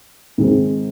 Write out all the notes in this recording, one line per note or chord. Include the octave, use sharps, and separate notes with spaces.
G#2 D#3 C4 G#4